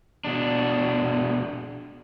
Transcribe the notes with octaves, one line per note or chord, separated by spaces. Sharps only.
B2 D4